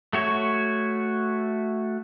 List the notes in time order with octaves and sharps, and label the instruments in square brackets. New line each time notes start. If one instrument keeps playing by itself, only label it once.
[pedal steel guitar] A3 F#4 C#5